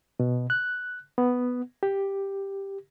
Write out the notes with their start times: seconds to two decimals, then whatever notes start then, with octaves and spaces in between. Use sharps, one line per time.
0.20 B2
0.50 F#6
1.18 B3
1.83 G4